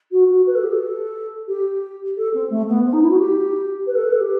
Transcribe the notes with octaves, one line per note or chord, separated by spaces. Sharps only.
F#4
F#4
B4
A4
G4
A4
G4
A4
C4
A3
B3
C4
D#4
E4
F#4
G4
B4
A4
B4
A4
G4